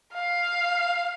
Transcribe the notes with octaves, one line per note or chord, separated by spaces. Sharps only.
F5